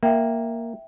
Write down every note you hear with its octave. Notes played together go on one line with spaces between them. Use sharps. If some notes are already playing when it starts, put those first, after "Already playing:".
A#3 E5 G5